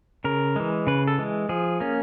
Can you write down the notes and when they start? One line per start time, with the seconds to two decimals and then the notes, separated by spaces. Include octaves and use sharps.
0.24 C#3 A#4
0.56 E3 G#3
0.87 C#3 B4
1.08 A4
1.18 E3 G#3
1.49 F3 G#4
1.80 A#3 C#4